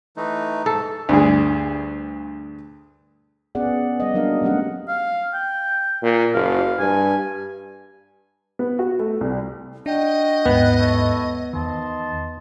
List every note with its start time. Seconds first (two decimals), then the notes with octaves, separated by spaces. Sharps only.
0.17 E3 A3 D#4
0.66 G#2 A4
1.09 D2 G2 G#4
3.55 B3 C#4 G#4 D5 F#5
4.00 G3 D#5
4.14 F#3 A#3 D4 A#4 F5
4.42 F#3 A3 C4 C#4 G4 F#5
4.88 F5
5.34 G5
6.02 A#2
6.34 F#1 F5
6.79 G2 G#5
8.59 B3
8.79 F#4
8.99 A3
9.21 C2
9.86 D4 F#4 D#5 G5
10.46 D#2 G#2 B3 B4 F#5 G5
10.77 E4 A4 C#5
11.53 E2 D#3 D#5 A5 C6